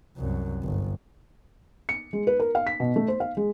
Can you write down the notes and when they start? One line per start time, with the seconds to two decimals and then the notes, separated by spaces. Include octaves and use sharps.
0.17 C2 F#2
0.64 G1
1.89 C#7
2.13 G#3
2.27 B4
2.40 A#4
2.55 F5
2.67 B6
2.80 B2
2.96 A3
3.08 C5
3.20 F5
3.37 G#3